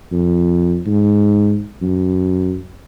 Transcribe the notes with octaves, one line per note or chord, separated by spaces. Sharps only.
F2
G#2
F#2